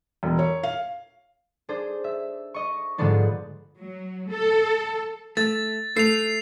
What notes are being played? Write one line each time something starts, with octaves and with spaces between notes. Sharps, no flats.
E1
C#5
F5
D4 G#4 C5
E5
D#5 C#6
G#2 D3 F3 G#3 B3 D4
F#3
A4
A3 A6
A3 C7 F7